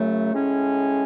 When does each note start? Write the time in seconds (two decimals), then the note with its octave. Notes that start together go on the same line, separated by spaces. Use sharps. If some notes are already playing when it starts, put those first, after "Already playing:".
Already playing: F#2 C#3 F#3 A3
0.33 A2 G#3 C#4